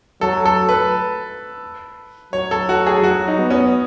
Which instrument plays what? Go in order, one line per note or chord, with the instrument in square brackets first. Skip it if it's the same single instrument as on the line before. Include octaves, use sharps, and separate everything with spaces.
[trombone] F#3 [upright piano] A4
[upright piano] A4
B4
[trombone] F#3 [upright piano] C#5
[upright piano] A4
F#4
G#4
[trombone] F#3 [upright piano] F#4
[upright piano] D#4
[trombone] B3
[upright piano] C#4